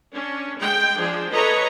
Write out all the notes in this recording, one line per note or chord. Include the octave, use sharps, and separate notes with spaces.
C#4 D4
G#3 G5
F3 D4 G#4
A4 B4 C#5 D#5 A#5